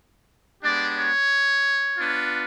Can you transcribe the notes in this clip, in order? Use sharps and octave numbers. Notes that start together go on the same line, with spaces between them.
G#3 B3 D4 G4 D5
C#5
B3 D4 F4